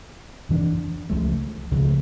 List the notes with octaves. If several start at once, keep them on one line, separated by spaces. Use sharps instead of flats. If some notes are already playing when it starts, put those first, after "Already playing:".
F2 E3 A#3 D4
C#2 C#3 F3 A3
C#2 C#3 F3 A3